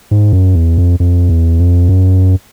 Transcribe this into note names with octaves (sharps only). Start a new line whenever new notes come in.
G#2
F#2
E2
F2
F2
E2
F2
F#2